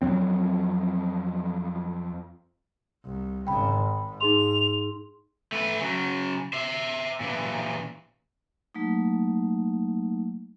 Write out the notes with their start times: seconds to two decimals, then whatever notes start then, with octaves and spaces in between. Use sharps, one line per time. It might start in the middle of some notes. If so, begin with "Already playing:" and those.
0.02 F2 F#3 C4
3.05 C2
3.47 G#1 C#3 G5 B5
3.77 G#2
4.21 D#4 G#4 C6 F7
5.52 A3 B4
5.81 C#3 F#3
6.53 C5 E5
7.20 A#2 E3
8.75 F#3 A3 A#3 D#4